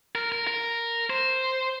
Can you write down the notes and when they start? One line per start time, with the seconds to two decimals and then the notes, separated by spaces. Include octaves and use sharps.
0.15 A#4
0.32 A#4
0.47 A#4
1.10 C5